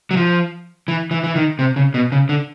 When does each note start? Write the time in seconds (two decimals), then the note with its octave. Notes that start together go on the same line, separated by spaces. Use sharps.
0.11 F#3
0.17 F3
0.88 E3
1.11 E3
1.24 E3
1.36 D#3
1.59 C3
1.76 C#3
1.94 B2
2.12 C#3
2.29 D3